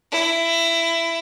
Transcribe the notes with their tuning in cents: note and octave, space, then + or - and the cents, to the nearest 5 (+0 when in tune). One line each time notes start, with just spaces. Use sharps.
E4 +15